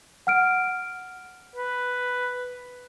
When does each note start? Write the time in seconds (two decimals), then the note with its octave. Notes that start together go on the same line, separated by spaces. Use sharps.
0.27 F#5 F6 D7
1.55 B4